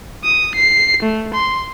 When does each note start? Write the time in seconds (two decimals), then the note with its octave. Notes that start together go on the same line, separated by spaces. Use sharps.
0.25 D#6
0.55 C7
1.03 A3
1.34 C6